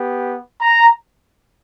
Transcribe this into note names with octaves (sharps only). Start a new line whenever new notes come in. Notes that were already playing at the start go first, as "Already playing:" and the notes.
Already playing: B3 G4
A#5